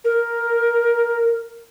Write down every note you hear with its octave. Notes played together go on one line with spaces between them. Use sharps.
A#4